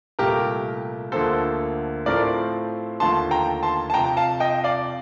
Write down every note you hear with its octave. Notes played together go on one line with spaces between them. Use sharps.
C2 A#2 A3 G4 A#4
D2 D3 F3 A#3 A4 C5
A2 F3 A3 C4 A#4 D5
D#2 D3 F3 A3 A5 C6
G5 A#5
A5 C6
A5
F2 C3 F3 G5 A#5
F5 A5
D#5 G5
D5 F5